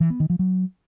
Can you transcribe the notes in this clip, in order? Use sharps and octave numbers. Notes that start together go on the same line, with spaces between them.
E3
B3
D#3
F3
F#3